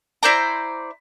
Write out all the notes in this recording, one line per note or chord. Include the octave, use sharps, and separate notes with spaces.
E4 C5 D5 A#5